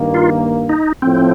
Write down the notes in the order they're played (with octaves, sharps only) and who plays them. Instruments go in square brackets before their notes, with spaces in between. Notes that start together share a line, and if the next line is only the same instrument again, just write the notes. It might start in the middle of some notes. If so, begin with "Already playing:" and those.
Already playing: [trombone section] G2 D#3 A#3
[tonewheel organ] F4
D#4
[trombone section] A2 F3 [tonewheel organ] C4